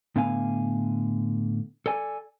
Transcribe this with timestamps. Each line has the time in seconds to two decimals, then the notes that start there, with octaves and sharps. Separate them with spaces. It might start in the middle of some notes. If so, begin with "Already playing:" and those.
0.16 A2 D3 B3 F5 G#5
1.86 A4 D5 G#5